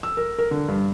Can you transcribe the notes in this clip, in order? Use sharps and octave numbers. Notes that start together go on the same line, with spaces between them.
E6
A#4
A#4
D3
G2